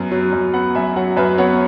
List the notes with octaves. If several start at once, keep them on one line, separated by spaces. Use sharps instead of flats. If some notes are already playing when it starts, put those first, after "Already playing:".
Already playing: F#2 B3
F#3
F#2
B3 F#5 B5
F#2 E5 G#5
F#3 C#5 F#5
F#2 B4 E5
B3 C#5 F#5